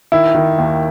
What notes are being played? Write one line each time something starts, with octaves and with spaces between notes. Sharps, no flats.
D#3 E4
D#3
D#2